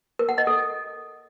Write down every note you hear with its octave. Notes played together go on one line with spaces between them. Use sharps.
A#4
F#5
D#5
A4